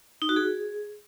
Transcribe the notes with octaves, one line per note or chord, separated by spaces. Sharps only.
D#4
F#4
G#4